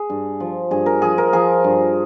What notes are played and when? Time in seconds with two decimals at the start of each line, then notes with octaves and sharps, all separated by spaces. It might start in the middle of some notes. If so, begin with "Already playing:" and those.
Already playing: G#4
0.10 G2
0.40 F3
0.71 G2 G#4
0.86 A#4
1.02 F3 G#4
1.18 A#4
1.33 F3 G#4
1.64 G2